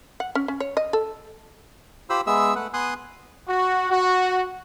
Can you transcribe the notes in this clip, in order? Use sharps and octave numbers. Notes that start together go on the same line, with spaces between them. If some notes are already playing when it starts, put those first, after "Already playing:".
F#5
C#4
C#4
C#5
D#5
A4
F4 G4 C5 B5 E6
G#3 B3 G#4 E5 E6
A3 B4 F#5
B3 G#5 C6 D#6 F#6
F#4
F#4